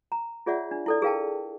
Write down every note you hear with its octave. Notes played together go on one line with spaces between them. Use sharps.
A#5
F4 G#4 C#5 D5 E5 F#5
D4
E4 A4 D5
G#4 A#4 F5 G5 A5